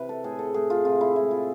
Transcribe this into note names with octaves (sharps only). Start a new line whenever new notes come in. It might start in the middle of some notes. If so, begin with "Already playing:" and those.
Already playing: C3 E3 B4
A4
A2 G#4
A4
A2 G#4
F4
C3 F4
E4
G#3 E4
F4